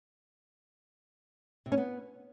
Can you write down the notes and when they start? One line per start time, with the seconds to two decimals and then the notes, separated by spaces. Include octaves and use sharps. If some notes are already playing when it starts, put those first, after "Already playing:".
1.66 C3
1.72 C#4
1.78 B3